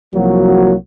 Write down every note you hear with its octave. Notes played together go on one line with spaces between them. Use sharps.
C2 F3 F#3 A#3 F#4